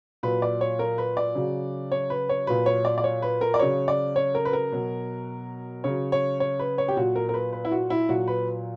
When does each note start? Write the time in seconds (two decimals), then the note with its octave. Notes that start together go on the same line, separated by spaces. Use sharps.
0.23 A#2 F#3 B4
0.42 D5
0.61 C#5
0.79 A#4
0.98 B4
1.17 D5
1.35 C#3 F#3
1.92 C#5
2.10 B4
2.29 C#5
2.47 A#2 F#3 B4
2.66 C#5
2.85 D5
2.98 D5
3.04 C#5
3.22 B4
3.41 A#4
3.54 D5
3.59 C#3 F#3 C#5
3.88 D5
4.16 C#5
4.35 A#4
4.45 B4
4.53 A#4
4.72 B2 F#3
5.84 C#3 F#3 C#5
6.12 C#5
6.40 C#5
6.59 B4
6.78 C#5
6.88 G4
6.97 A#2 F#3 F#4
7.16 A#4
7.29 A#4
7.34 B4
7.53 B4
7.65 E4
7.71 F#4
7.90 E4
8.09 A#2 F#3 F#4
8.28 B4